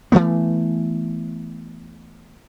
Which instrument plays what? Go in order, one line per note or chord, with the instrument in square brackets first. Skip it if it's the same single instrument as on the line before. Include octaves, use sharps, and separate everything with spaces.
[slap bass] E3 F#3 A3 B3